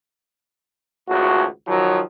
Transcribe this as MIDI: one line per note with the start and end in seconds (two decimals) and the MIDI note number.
1.09 1.44 32
1.09 1.44 37
1.09 1.44 45
1.09 1.44 66
1.68 2.00 51
1.68 2.00 53
1.68 2.00 54